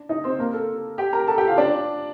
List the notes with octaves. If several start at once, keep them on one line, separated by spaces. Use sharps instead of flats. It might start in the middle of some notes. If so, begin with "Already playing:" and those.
Already playing: D4
D#4 D#5
C4 C5
A#3 A#4
A4
G4 G5
A#4 A#5
A4 A5
G4 G5
F4 F5
D4 D5